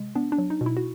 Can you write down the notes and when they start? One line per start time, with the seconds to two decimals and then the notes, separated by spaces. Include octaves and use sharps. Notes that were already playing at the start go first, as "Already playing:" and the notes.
Already playing: C3 G#3
0.15 B3 D4
0.32 D4
0.38 F#3
0.50 D#4
0.61 B2
0.66 E4
0.77 F#4